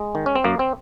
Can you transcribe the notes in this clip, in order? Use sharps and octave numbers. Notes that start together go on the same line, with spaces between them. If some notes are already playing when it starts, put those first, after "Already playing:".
Already playing: G#3
D#3
C#4
C4
F#2 A#3
C4